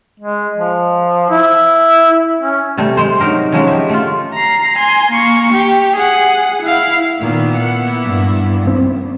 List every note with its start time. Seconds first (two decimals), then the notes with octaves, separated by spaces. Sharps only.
0.19 G#3
0.58 F3
1.30 E4
2.40 C#4
2.77 C3 G3 A3
2.97 G#3 C5
3.19 F#3 D#4 A#4 C5
3.52 C#3 F3 F#3 G#3
3.68 G4 E5
3.89 A3 F4
4.34 A#5 C7
4.78 G#5 C6
5.11 A#3 C#6
5.53 G4
5.96 G#4 F#5
6.62 E4 F5
7.20 A#2 D#3 A#3 B3 E4
7.56 F#5
8.03 G2
8.67 C4